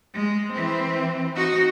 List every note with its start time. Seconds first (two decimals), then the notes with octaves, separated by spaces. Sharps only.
0.14 G#3
0.53 E3 C4
1.36 D#4 F#4